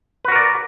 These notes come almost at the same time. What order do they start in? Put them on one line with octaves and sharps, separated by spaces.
B4 F#4 A#4 D5